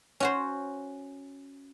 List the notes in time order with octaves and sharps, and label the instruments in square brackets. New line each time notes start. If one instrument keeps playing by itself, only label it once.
[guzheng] C#4 F#4 C5